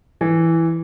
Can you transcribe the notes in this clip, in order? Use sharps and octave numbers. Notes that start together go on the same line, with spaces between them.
E3